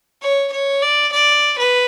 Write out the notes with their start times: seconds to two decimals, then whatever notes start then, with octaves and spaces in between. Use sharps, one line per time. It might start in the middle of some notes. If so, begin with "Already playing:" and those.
0.22 C#5
0.52 C#5
0.82 D5
1.12 D5
1.58 B4